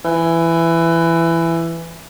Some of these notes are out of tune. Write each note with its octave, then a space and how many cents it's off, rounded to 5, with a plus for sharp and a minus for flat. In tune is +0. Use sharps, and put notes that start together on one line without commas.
E3 +15